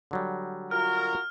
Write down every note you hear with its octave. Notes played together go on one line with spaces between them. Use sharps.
D3 F#3 G3
F4 F#4 A#4 F6